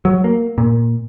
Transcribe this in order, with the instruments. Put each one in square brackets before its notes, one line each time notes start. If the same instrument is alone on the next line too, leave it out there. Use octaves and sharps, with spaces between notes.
[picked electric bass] F#3
A#3
A#2